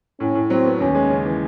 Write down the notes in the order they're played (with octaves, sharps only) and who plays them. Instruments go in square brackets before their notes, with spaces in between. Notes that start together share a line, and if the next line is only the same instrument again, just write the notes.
[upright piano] A2 [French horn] C#4
[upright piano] A2
[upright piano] F#3 [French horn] C4
[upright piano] B3
[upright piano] D#2 [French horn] C#4
[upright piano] G#3
C#3
E3